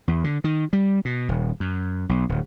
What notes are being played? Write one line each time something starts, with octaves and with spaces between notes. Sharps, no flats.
E2
D3
D#3
G3
B2
D#1
F#2
B1
D1